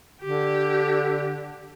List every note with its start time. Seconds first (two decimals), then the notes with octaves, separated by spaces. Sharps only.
0.21 D3 G4